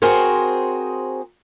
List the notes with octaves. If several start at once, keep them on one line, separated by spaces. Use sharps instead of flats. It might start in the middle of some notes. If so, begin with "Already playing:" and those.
C4 F#4 G#4 A#4 C5 C#5